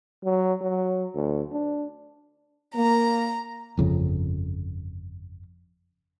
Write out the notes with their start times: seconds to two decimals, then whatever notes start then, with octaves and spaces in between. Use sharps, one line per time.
0.24 F#3
0.61 F#3
1.15 D2
1.52 D4
2.75 A#3 A#5
3.77 G1 F2 C#3